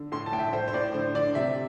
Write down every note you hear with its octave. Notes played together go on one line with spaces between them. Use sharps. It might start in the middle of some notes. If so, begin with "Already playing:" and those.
Already playing: D3
A2 C6
A5
A2 G5
E5
A2 C5
C5
A2 D5
D3 C5
D3 D5
C3 E5